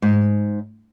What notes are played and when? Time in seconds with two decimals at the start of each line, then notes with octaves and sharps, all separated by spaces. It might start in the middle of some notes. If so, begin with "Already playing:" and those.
0.02 G#2